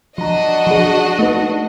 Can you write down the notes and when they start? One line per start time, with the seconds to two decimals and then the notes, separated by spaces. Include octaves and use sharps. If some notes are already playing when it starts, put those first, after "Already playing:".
0.18 F3 D4 F#4 D#5 A#5
0.67 F3 G#4
1.19 A3 D#4 B4